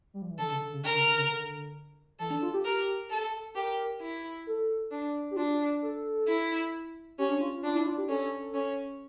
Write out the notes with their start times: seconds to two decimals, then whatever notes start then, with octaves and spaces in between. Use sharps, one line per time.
0.14 G3
0.22 F3
0.30 E3
0.38 D3 A4
0.50 C#3
0.61 D3
0.73 C#3
0.83 D3 A#4
0.94 C#3
1.07 D3
1.17 C#3
1.30 D3
2.19 E3 A4
2.30 D4
2.42 F4
2.54 G4
2.65 G4 A#4
3.10 A4
3.55 G4 A#4
4.01 E4
4.47 A4
4.91 D4
5.31 G4
5.36 D4 F4
5.82 A4
6.28 E4
7.18 C#4 G4
7.29 D4
7.40 F4
7.53 F4
7.63 D4 F4
7.74 E4
7.86 F4
7.98 G4
8.08 C#4 A4
8.54 C#4